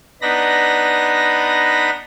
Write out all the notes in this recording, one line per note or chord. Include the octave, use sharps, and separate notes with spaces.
B3 D4 D#4 B5 A#6